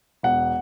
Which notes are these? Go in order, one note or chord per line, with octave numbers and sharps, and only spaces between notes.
E1 F#5